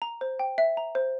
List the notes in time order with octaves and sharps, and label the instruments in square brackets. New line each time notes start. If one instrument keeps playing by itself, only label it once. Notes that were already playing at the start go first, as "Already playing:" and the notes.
[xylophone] A#5
C5
G5
E5
A#5
C5